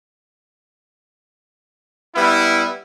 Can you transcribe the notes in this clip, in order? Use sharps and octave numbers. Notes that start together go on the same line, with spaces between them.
G3 B3 E4